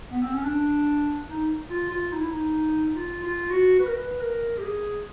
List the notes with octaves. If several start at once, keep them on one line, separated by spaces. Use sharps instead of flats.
B3
C4
C#4
D4
D#4
F4
F4
D#4
E4
D#4
F4
F4
F#4
B4
A#4
B4
A#4
G4
G#4